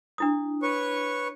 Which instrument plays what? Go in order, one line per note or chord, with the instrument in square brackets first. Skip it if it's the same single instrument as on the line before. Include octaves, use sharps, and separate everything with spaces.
[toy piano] D4 E4 D#6
[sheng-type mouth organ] B4 C#5 C#6